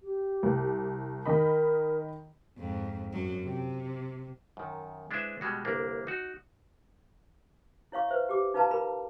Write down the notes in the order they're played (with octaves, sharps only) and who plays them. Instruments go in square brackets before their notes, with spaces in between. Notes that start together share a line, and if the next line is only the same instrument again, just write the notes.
[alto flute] G4
[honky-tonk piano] C2
[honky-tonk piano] D#3 D#5 B5 [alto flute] A#4
[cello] F2 G#2
F#2 F#3
C3
[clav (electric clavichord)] F#2 D#3
G#3 D4 E4 B4 C5 E5
B2 G3 G#3 F#4
G1 C2 A#3 D4
D#4 F#4
[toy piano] E4 C#5 F5 C#6
B4 C5 E5
G4 D6
D#4 F4 B4 F5 A5 A#5
F4 A#4 B5